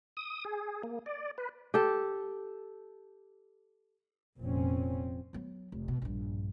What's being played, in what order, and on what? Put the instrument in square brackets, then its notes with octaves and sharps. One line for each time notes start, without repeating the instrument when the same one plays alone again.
[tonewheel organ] D#6
G#4
A#3
D5
B4
[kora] G4 A4
[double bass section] F1 A#2 C4 C#4
[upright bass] F#3 B3
F1
B2
A#1 G2